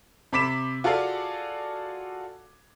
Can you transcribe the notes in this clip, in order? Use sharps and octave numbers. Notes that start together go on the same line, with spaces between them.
C3 B5 D6 B6 E7
F4 F#4 G#4 A4 D5 F5